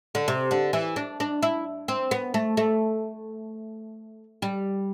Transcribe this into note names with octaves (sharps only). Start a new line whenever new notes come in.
D3
C3
D3
E3
D4
D4
E4
C4
B3
A3
A3
G3